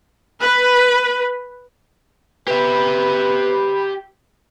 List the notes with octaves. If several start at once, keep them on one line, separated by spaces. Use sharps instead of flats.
B4
B3 G4 B4 E5 B5